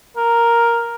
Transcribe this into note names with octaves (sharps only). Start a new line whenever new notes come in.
A#4